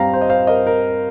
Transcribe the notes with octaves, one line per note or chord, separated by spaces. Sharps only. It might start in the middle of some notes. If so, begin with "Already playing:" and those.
Already playing: G2 G3 C4 F5 G5 A#5
C5
D#5
C5 F5
A#4 D#5
A#4